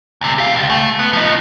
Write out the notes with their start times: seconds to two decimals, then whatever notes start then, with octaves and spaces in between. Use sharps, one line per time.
0.21 D2 C3
0.38 G4 F5
0.55 C#2
0.70 A3
0.99 B3
1.13 F3 D#4